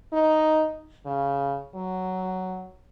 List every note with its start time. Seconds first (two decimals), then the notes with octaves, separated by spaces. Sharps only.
0.13 D#4
1.06 C#3
1.75 F#3